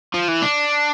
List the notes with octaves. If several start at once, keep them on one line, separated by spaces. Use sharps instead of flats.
F3
E3
D4